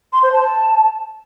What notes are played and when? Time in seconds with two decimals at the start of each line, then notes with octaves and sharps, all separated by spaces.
0.13 C6
0.22 C5
0.32 A5